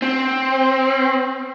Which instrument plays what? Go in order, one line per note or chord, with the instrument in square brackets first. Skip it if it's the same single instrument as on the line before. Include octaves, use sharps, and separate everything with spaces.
[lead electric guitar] C4